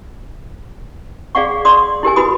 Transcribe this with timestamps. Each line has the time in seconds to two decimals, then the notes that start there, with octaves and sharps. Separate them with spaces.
1.35 G#4 D5 F5 F#5 C#6
1.65 D5 C6 D#6
2.03 E4 G4 A#4 G#5
2.16 E4 F#4 B4 B5 D#6